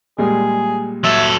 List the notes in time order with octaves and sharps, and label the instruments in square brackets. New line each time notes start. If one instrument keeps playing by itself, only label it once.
[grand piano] A#2 G3 G#3 [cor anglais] G#4
[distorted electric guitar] F#3 A4 [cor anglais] E5